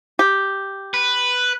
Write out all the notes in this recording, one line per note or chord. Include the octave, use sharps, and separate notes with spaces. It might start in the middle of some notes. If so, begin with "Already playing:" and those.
G4
B4